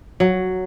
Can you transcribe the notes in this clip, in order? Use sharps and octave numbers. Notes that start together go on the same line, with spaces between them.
F#3